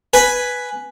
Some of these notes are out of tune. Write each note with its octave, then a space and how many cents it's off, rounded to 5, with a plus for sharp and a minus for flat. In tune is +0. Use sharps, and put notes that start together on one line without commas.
B4 +0 G#5 +5